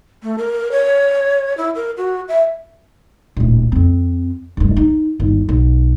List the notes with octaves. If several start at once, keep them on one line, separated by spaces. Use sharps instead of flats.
A3
A#4
C#5
E4
A#4
F#4
E5
D1 A#1
F2 C4
F1 G2
D#4
G1 D#2
B1